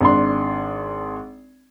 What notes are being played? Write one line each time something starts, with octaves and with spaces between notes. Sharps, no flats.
G#1 D4 C6